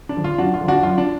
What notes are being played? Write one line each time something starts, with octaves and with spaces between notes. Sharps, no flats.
D4
D3 F3
F4
F#2 D4 F#4
F4
D3 F3
D4 F#4
F#2 F4
D4